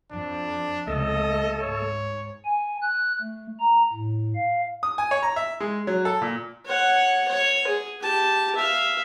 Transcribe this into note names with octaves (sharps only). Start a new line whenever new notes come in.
F2 F3 D4
C#2 C3 A3 A4 D#5
G#2 C#5
G#5
F#6
A3
A#5
A2
F5
D#6
G#5
C#5
A#5
E5
G#3
F#3
A4
A#2
C#5 F#5
C#5
G#4
G4 A5
E5 F5